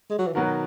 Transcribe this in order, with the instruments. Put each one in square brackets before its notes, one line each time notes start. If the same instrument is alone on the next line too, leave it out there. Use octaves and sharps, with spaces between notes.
[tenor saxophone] G#3
F#3
E3
[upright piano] B2 F#3 B3 F#4 A#4 [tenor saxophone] D#3